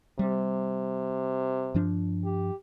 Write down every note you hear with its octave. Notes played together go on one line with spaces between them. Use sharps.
C3 G3
G2 F3 D4
G4